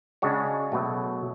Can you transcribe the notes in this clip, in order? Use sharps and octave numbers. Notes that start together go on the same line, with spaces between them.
C#3 G#3 D4 F#4 C#5
B2 F#3 A3